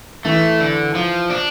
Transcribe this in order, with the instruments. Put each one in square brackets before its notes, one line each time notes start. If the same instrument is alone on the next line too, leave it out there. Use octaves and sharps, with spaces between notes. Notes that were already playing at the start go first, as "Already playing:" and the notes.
[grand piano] E3 [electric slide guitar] A3
[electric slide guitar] D3
F3
D4